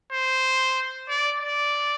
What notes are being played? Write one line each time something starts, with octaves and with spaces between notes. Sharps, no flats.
C5
D5
D5